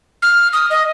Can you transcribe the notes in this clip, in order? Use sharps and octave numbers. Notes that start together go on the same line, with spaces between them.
F6
D#6
D#5